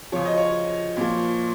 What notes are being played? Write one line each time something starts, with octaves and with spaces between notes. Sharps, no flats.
C#3 F3 C#5
D#5
C#5
A#2 F3